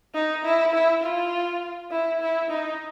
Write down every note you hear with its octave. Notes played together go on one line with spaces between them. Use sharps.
D#4
E4
E4
F4
E4
E4
D#4